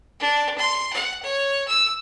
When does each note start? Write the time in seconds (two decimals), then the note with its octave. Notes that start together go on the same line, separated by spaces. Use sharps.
0.20 D4
0.58 C6
0.93 F#5
1.23 C#5
1.68 E6